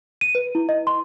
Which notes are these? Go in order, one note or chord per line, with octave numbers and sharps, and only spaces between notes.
D#7
B4
E4
D#5
C6